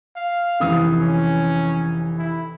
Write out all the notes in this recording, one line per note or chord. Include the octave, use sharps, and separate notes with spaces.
F5
F1 E3 D#6
C#4
E4